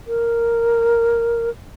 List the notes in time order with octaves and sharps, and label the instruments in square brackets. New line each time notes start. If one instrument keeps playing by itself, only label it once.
[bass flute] A#4